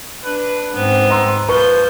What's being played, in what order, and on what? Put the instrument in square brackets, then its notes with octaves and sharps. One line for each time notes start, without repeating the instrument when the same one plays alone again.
[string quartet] D4 [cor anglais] B4
[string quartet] G#2 C4 [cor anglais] B3
[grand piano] A#5 C6 E6
[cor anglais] F3 [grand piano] B4 C#6 [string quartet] G6